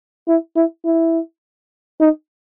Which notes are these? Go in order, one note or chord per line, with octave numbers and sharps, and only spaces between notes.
E4
E4
E4
D#4